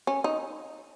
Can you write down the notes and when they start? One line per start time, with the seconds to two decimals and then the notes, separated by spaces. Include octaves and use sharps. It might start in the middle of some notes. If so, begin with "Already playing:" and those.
0.07 C#4
0.24 D#4